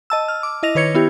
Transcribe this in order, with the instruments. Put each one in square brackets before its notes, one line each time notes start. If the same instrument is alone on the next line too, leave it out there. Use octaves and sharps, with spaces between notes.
[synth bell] D#5 A5 E6
F6
D6
E4 D#5 A#6 F7
D#3 B4 C#5 G#6 C#7
B3 E4 G4